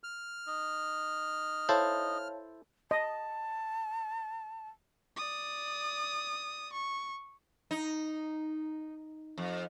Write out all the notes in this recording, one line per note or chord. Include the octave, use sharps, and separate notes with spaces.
F6
D#4
E4 A4 C5 C#5 F5 A5
D#5 A5
D5 D#6
C#6
D#4
F2